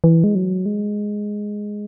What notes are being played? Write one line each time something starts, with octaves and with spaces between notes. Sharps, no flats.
E3
G#3
F#3
G#3